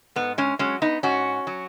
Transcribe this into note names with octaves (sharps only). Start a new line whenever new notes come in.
G#2 B3
G#3 C#4
F#3 G#3 C#4
B3 D#4
G#2 C#4 F#4
F#3